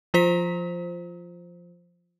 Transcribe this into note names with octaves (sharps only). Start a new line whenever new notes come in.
F3 F4 C5 B6